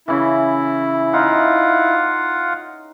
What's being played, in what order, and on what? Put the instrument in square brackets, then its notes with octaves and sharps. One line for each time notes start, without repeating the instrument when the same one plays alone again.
[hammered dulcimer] C#3 E3 [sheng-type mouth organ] E4
[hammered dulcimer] D#4 [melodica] F4 F5 F#5